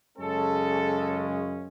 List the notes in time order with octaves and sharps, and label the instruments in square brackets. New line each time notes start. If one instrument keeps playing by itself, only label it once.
[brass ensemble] F#2 C#3 G#3 C#4 A4